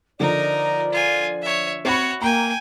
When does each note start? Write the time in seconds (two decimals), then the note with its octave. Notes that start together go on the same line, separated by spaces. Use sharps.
0.20 D3 F3 D#4 A#4 D5
0.92 F4 G#5
1.42 C#5 E5
1.85 C4 F#4 C#5 B5
2.22 A#3 G5 G#5 A#5